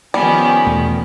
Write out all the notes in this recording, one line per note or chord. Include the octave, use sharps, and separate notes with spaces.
D#3 F3 G3 B3 C#4
E2 B2 A3